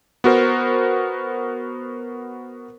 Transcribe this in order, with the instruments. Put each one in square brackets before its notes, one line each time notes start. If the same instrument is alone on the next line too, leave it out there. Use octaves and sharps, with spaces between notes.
[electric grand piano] B3 F#4 A#4 C5